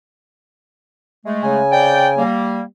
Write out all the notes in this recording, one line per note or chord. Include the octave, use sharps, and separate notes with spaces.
G#3 A3
C#3 G#5
C3 D5 G5
G3 A#3